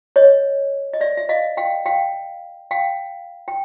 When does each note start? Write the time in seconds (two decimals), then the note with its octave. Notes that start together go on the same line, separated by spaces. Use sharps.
0.16 C#5 D#5
0.93 D#5
1.01 D5 E5
1.17 E5
1.29 D#5 F5
1.57 F5 G5
1.86 F5 G5
2.71 F5 G5
3.48 G5